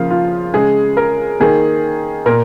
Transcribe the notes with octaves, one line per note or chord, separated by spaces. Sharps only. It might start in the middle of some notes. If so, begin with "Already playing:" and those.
Already playing: C#3 F3 A#3 F5
F4
C#3 G#3 G#4
A#4
D#3 A#3 G#4
A#2 A#4